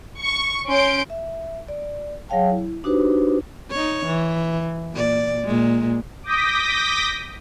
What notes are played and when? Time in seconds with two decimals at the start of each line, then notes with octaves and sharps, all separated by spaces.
0.21 C#6
0.67 C#4 C6 G6 D7
1.10 E5
1.68 D5
2.29 F#3 G#4 C#5 F5 G5 A5
2.50 E4
2.84 D4 D#4 F#4 G4 B4 C5
3.71 D#4 C#5
4.06 E3
4.93 A#2 D5
5.45 A#2 G#3
6.23 D6 D#6 G6 A#6 B6